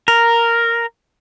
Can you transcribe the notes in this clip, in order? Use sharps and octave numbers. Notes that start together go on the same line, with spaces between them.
A#4